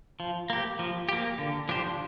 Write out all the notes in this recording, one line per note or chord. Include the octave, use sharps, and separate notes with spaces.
F3
A#3 G4
F3
A#3 G4
D3
F3 D4 G4 C5